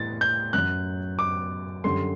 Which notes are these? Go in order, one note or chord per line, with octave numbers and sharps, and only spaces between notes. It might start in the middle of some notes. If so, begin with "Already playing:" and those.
Already playing: A2 E3 G3 A6
G6
F#2 F#3 F#6
D6
F#2 D3 G3 C6